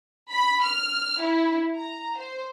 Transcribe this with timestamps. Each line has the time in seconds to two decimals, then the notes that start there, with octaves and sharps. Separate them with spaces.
0.31 B5
0.64 F6
1.21 E4
1.77 A#5
2.16 C5